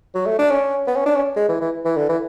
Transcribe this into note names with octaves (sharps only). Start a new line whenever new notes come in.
F#3
A3
D4
C#4
B3
C#4
D4
C#4
G#3
E3
E3
E3
D3
E3